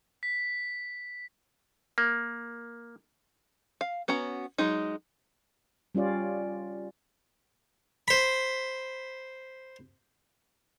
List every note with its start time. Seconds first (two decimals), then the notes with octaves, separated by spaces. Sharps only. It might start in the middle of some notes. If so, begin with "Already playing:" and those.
0.23 B6
1.98 A#3
3.81 F5
4.08 B3 C#4 F#4 A#5
4.58 F#3 G#3 D#4
5.95 G3 C#4 F4 D5
8.08 C5 B5